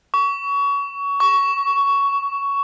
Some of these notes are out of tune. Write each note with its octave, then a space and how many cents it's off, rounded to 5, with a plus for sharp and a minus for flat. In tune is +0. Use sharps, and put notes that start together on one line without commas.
C#6 +25
C#6 +10